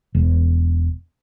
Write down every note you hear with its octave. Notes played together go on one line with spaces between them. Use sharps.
E1